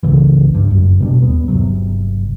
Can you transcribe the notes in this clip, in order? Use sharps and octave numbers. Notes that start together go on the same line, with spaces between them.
G#1 C#2 C#3 E3
G2
F#1 F#2
B2 G3 D4
D#2 B3
G1 C3 F#3